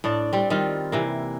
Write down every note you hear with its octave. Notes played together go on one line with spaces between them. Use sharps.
A2 D4 D5
G3 C4
D#3 G3 F4
C3 E3 A#3